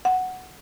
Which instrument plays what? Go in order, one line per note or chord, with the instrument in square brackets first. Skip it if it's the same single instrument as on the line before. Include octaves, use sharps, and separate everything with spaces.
[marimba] F#5